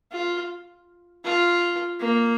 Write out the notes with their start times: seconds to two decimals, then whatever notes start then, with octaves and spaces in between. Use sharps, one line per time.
0.11 F4
1.24 F4
2.00 A#3